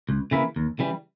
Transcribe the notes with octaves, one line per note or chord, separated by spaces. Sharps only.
C#2
C#3 E3 A#3 E4
D#2
C#3 E3 G3